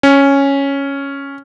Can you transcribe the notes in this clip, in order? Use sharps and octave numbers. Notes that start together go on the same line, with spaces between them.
C#4